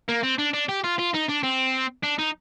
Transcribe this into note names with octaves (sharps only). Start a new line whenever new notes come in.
A#3
C4
D4
D4
G4
F4
F4
D#4
D4
C4
D4
D#4